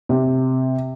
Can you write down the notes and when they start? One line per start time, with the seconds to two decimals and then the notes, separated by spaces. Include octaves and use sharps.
0.09 C3